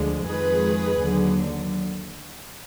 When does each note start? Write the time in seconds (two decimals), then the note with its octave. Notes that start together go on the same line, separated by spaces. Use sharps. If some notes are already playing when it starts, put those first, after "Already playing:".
Already playing: D2 D3 F3 G#3
0.27 F2 D#3 G#3 G#4 B4
1.01 D#2 D3 F#3